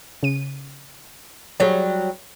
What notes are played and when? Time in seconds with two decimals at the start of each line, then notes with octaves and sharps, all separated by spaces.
0.23 C#3 D#7
1.60 F#3 G3 G#4 C#5